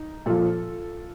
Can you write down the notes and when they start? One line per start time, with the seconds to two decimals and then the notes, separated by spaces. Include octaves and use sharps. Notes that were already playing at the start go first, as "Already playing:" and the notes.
Already playing: D#4
0.26 A#2 F3 F4 A4